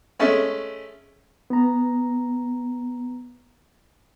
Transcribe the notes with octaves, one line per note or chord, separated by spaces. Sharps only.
G#3 A3 C#4
B3 A#5